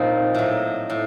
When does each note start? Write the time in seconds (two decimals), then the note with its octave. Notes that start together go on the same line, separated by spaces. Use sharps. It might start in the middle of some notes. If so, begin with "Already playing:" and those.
Already playing: A#2 F3 C4 D#4
0.35 A2 F#3
0.90 A2